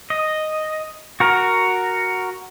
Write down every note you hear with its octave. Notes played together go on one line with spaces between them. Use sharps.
D#5
F#4 A#4